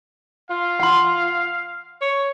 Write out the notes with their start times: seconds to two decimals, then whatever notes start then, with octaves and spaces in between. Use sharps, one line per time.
0.50 F4 F5
0.80 F#5 C6
2.01 C#5